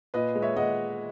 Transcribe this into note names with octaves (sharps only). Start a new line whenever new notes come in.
A#2 B4 D#5
G#3
C#5 E5
G#3 D#5 F#5